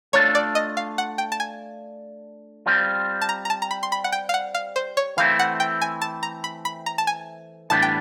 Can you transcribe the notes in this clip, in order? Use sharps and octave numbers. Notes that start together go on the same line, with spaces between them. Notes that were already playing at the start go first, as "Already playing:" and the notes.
A3 D4 F4 A4 C#5
D5
D#5
F5
F#5
G5
A5
G#5
G3 C4 F4
A5
A#5
A#5
A5
A#5
B5
C6
B5
F#5
G5
F5
F#5
F5
C5
C#5
E3 A3 C4 E4 F5
F#5
G5
G#5
A5
A#5
B5
B5
A#5
A5
G#5
A2 E3 G3 B3 D4 A5
G5